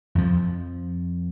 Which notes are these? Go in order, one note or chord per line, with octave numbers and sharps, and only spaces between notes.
F2 F3